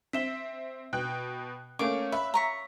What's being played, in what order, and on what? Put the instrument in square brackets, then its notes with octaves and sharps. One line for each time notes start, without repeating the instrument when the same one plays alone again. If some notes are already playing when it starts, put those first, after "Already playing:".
[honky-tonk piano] C4 E5 [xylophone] B6 E7 G7
[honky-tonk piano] B2 G5 F#6
[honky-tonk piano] A3 A#3 C#4 [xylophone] C#5 F5 C#6 [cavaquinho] D6
[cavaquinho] B4 [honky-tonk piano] E5
[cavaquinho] A#5 C#6 [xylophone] E6 B6